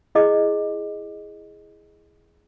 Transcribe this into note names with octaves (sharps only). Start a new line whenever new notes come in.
E4 G#4 D#5 D6